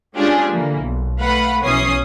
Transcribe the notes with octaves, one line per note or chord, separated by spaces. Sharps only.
G#3 C#4 D4 F4 G4 G#4
D3 E3 A#3
B1
A3 B4 F5 F#5 B5
B1 E3 C#4 C#5 D#6 C7